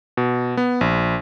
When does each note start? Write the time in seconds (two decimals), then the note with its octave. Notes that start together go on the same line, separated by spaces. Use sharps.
0.17 B2
0.57 B3
0.81 A#1